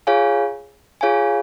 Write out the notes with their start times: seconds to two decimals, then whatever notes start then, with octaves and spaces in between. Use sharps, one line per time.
0.07 F4 G#4 C#5 F5 G#5
1.01 F4 G#4 C#5 F5 G#5